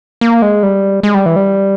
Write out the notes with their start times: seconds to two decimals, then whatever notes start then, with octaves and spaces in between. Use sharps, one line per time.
0.21 A#3
0.42 G#3
0.63 G3
1.03 G#3
1.14 G3
1.26 E3
1.36 G3